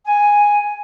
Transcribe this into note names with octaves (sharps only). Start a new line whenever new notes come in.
G#5